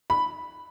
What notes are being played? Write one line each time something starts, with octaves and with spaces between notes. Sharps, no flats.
B5